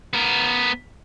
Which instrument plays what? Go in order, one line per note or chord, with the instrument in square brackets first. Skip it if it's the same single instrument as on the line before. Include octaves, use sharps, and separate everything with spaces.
[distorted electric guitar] B3 A#4